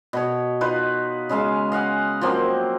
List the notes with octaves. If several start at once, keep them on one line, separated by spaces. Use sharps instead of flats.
B2 C#5
D#4 F4 B4
C#3 G#3 E5 F5
D#5 F5 F#5 G#5
F3 F#3 A#3 C4